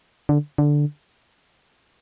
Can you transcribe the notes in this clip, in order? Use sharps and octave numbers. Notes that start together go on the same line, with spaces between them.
D3
D3